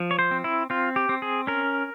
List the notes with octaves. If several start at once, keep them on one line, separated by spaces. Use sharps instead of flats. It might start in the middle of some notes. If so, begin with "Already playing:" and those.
Already playing: F3
C#5
C5
C4
E4
C4 F4
G4
C4
G#4
C#4 A#4